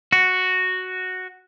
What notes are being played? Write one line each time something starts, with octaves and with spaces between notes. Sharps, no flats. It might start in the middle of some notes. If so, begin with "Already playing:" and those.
F#4